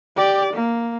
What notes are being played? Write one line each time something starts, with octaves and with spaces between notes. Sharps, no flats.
G4 D5
A#3